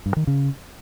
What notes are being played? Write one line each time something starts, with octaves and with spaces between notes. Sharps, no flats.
G2
D#3
C#3